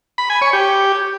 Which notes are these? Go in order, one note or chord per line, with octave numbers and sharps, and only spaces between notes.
B5
G#5
C#5
G4